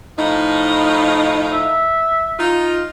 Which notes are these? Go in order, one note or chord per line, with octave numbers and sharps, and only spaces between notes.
A2 F3 D#4
E5
D#4 F4